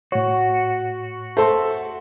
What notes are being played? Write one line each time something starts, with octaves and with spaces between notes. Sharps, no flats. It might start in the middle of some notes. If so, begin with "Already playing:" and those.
A2 F#4 C#5
A3 A4 C5 E5 C6